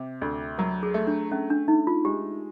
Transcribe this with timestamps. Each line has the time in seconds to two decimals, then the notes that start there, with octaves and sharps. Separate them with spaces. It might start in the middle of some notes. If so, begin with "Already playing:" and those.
Already playing: C3
0.21 D2
0.58 F#3 A#4
0.83 G#4
0.94 A3
1.07 D4
1.31 A3 C#4
1.50 D4
1.68 A3 D#4
1.87 F4
2.05 G#3 G4